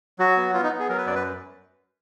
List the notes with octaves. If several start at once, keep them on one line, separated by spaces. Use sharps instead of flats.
F#3 F#4
B3
B3 F4
D#4
B3
G#4
F#3 A#4
B4
F#2 D5
B4